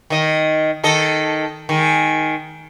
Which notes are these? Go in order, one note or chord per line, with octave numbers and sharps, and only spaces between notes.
D#3 D#5
D#3 A4 D#5
D#3 G#3